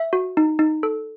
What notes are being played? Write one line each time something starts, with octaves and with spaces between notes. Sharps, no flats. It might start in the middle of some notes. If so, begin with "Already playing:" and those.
Already playing: E5
F#4
D#4
D#4
A4